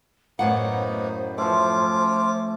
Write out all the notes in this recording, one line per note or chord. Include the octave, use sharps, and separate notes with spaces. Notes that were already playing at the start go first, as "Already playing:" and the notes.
F#2 A2 A#3 B3 D#4 C5 F#5
F3 A3 C#4 F4 D6